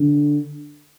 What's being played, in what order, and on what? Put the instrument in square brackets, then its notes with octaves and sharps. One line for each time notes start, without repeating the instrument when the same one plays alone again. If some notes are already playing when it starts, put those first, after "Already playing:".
Already playing: [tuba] D3